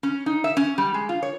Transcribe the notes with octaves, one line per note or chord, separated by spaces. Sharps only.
C#4
D#4
E5
C#4
G3
G#3
F4
C#5